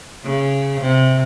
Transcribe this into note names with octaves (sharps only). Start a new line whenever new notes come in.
C#3
C3